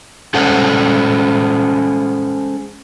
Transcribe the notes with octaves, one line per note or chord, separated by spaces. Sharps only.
G#3 C#4 A4 C5 F#5